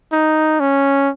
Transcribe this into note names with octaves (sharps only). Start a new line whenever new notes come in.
D#4
C#4